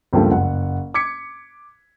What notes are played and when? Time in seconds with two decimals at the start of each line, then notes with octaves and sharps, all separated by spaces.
0.13 C#2 G2 F3 G3 A3 A#3
0.31 F#1 F#5
0.94 D6 G#6 B6 C#7